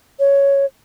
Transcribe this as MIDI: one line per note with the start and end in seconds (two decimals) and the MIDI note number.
0.20 0.66 73